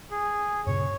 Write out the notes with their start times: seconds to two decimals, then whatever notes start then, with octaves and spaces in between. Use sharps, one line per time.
0.11 G#4
0.67 G2 A#2 C#3 C#5